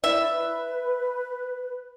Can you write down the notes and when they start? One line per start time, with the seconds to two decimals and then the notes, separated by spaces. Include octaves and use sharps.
0.04 E4 D5 E5
0.29 B4